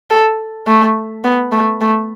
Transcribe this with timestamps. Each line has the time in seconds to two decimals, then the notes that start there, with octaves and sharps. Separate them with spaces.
0.10 A4
0.67 A3
1.24 B3
1.52 A3
1.81 A3